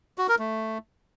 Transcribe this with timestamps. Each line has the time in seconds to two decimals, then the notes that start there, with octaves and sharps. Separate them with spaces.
0.18 F#4
0.29 A#4
0.39 A3